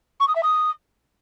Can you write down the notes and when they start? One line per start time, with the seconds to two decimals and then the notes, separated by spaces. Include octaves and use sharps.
0.20 C#6
0.28 D#6
0.35 E5
0.43 D#6